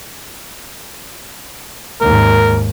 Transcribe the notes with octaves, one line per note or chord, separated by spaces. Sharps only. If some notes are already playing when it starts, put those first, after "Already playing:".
D#2 G#2 A#4